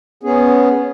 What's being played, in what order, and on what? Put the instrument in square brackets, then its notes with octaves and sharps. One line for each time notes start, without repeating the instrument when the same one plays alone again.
[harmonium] B3 C#4 G#4